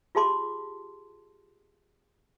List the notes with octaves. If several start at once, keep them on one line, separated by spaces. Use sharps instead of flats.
F4 G4 G#4 A5 C6 D6